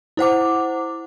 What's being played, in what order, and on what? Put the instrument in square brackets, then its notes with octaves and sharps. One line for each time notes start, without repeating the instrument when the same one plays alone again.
[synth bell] E4 C5 F#5 D6